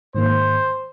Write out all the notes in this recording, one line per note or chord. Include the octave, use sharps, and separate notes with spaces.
G#2 D#3 A#3 C5